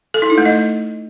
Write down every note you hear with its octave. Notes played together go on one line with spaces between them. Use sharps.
A4
E4
D#4
A3
D#5